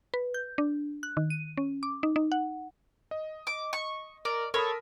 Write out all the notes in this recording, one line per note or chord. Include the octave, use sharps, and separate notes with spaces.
B4
G6
D4
F#6
D#3
D#7
C#4
D6
D#4
D#4
F#5
D#5
D6
C#6
A#4 D5
A4 A#4 C#5 B5 D#6